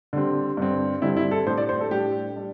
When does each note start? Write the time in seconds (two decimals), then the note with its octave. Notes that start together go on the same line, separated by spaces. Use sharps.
0.13 D3 G3 C4
0.57 G2 D3 G3 C4
1.02 G2 D3 G3 C4 E4
1.17 E4
1.31 A4
1.46 A2 G3 D4 C5
1.57 D5
1.69 C5
1.81 A4
1.91 A2 G3 D4 G4
2.36 G3 D4